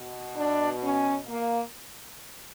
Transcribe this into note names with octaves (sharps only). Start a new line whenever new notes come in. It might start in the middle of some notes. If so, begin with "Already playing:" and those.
Already playing: B2
D4
C#4
A#3